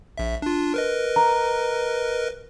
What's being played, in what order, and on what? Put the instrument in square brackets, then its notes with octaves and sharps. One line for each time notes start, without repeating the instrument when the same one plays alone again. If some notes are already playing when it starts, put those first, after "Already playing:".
[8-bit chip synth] A#1 E5
D4 F4
A#4 B4 D#5
[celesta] A#5